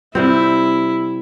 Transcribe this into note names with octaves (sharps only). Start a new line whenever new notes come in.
C3 G3 C4 E4